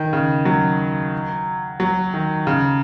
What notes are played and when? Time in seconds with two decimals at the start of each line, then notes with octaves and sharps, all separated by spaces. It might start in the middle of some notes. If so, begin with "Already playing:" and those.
Already playing: D#3
0.13 C#3
0.45 F#3
1.80 F#3
2.14 D#3
2.47 C#3